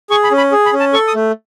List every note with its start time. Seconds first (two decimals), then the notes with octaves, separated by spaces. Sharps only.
0.10 G#4 C#6
0.24 B5
0.31 C#4
0.38 B5
0.52 G#4
0.66 B5
0.73 C#4
0.80 A5
0.93 A4 C#6
1.08 D#6
1.15 A3